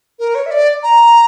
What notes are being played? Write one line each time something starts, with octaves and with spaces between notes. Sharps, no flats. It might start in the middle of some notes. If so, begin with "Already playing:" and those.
A#4
C#5
E5
D5
A#5